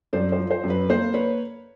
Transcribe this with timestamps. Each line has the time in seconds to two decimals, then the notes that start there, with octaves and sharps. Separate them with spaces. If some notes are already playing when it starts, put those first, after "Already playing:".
0.13 F#2 C5 D5
0.32 C5
0.38 F3
0.51 C5
0.64 F#2
0.70 B4
0.89 A#3 C5
1.14 B4 C#5